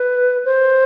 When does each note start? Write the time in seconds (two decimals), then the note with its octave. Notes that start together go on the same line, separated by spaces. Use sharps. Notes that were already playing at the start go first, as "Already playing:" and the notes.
Already playing: B4
0.45 C5